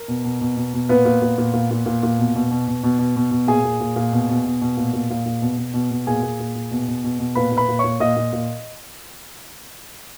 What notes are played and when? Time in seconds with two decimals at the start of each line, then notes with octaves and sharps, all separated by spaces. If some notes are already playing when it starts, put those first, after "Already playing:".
Already playing: A#4
0.08 B2
0.24 B2
0.41 B2
0.57 B2
0.74 B2
0.89 A#2 B3 B4
1.05 A#2
1.22 A#2
1.38 A#2
1.53 A#2
1.71 A#2
1.86 A#2
2.03 A#2
2.19 B2
2.35 B2
2.51 B2
2.68 B2
2.83 B2
2.99 B2
3.16 B2
3.31 B2
3.47 A#2 G#4 G#5
3.64 A#2
3.80 A#2
3.96 A#2
4.12 B2
4.29 B2
4.46 B2
4.62 B2
4.77 A#2
4.93 A#2
5.10 A#2
5.26 A#2
5.42 B2
5.58 B2
5.74 B2
5.91 B2
6.07 A#2 G#4 G#5
6.22 A#2
6.40 A#2
6.55 A#2
6.71 B2
6.88 B2
7.04 B2
7.19 B2
7.35 A#2 B4 B5
7.52 A#2
7.57 B4 B5
7.68 A#2
7.79 A#2 C#5 C#6
8.00 A#2 D#5 D#6
8.17 A#2
8.33 A#2